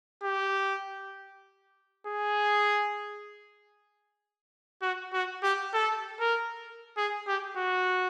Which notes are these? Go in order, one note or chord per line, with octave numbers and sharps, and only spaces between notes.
G4
G#4
F#4
F#4
G4
A4
A#4
G#4
G4
F#4